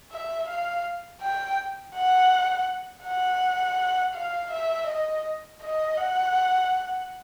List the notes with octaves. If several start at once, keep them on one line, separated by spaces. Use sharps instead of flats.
E5
F5
G5
F#5
F#5
F5
E5
D#5
D#5
F#5